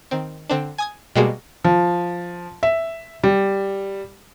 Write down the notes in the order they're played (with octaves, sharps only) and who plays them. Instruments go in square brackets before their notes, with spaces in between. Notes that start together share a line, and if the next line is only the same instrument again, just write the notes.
[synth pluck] D#3 C4
D3 C4 D4
G#5 D#6 G#6
B2 G3 G#3 A#3 F#4 G#4
[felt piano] F3
E5
G3